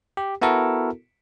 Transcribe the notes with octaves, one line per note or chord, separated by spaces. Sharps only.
G4
B3 E4 F#4 A4 A#4